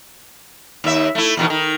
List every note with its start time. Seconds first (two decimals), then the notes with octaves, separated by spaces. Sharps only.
0.84 D#2 E5
1.15 A3 E4
1.37 E2 B2 D#3
1.50 D#3